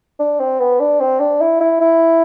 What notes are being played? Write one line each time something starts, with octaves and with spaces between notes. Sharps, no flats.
D4
C4
B3
D4
C4
D4
E4
E4
E4